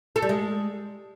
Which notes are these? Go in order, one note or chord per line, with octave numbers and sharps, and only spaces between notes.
A4
G3
G#3